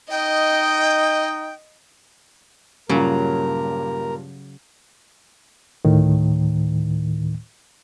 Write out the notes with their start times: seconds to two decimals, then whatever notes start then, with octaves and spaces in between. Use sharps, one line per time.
0.10 D#4 D#5 G5
2.89 G2 A#2 C#3 F#3 G4 A#4
5.85 D2 A2 D#3